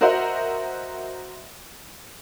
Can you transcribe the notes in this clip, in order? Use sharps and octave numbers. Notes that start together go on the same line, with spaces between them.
F#4 A#4 C5 D#5 E5 F#5